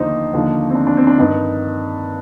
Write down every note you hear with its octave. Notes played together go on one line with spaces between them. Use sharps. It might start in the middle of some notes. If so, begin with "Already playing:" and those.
Already playing: D#2 D3 F3 D#4 C5
D#2 D3 F3
C4
D4
D4
C4
D4
G2 D#3 D#4